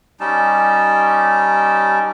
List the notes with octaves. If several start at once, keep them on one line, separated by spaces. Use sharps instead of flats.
G3 C#4 D#4 A5